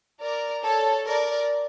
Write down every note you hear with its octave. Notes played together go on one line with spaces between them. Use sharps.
A#4 D5
A4 C#5
A#4 D5